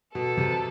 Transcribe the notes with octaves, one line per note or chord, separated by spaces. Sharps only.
B2 A4
C3